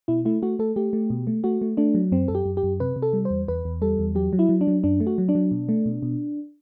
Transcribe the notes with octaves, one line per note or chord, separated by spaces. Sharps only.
B2 E4
A3 E4
A3 F#4
A3 A4
A3 G4
A3
B2
A3
A3 F#4
A3
A3 D4
F#3
F#2 C4
F#2 A4
G4
F#2
G4
F#2
C3 B4
C3
A4
G3
C5
E2
E2 B4
E2
G3 A4
E2
F#3 G4
F#3
E4
F#3
D4
F#3
F#2 D4
A3
F#4
F#3
D4
F#3
B2
A3
B2
B2